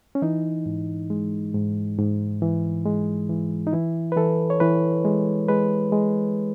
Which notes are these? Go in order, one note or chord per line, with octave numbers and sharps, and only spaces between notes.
C#4
E3 D#4
G#2
G#3
G#2
G#2
E3
G#3
E3
D#4
E3 E4
B4
E3 A4
C#5
E3 B4
G#3
G#3 B4
G#3